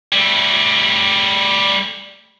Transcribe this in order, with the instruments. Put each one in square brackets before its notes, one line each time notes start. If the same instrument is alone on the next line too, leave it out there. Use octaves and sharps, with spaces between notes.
[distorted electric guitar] G3 A3